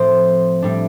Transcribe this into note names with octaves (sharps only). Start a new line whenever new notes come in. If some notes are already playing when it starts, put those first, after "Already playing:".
Already playing: A2 F3 C4 C5
A2 G3 D4